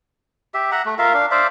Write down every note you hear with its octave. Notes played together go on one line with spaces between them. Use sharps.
G4 E5
E5 F#5 A#5
A3
F4 A#4 E5 F5
D4 F5
C5 D5 E5 F5